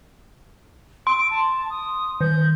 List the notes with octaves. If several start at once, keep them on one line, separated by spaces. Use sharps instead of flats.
C6 D7
A5
D#6
D#3 G6